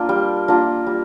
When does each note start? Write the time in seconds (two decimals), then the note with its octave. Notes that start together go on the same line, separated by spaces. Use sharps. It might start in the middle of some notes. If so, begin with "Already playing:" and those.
Already playing: A#3 D4 F4
0.09 G3
0.48 A#3 D4 F4
0.87 G3